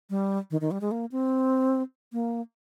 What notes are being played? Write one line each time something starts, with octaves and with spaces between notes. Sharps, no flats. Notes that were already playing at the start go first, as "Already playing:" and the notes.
G3
D#3
D#3
G3
G#3
A#3
C4
A#3